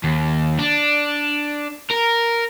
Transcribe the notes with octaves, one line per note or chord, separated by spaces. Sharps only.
D#2
D4
A#4